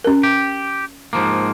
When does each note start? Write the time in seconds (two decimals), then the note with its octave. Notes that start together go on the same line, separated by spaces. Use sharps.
0.04 C#4 A#4
0.23 G4
1.13 G#2 F3 A#3